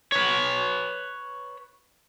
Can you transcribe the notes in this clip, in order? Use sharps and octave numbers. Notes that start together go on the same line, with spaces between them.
B4 C#5